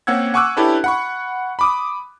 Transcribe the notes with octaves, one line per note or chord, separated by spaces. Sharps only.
A#3 C4 C#4 F#5 E6 G#6
F#5 G#5 C#6 D6 E6 F#6
C#4 D4 E4 G4 A4 B4
F#5 B5 C#6
B5 D6 D#6